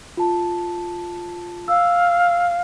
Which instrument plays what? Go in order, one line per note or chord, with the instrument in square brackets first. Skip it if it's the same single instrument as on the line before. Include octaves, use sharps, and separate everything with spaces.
[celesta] F4 A5
[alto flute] F5 [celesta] E6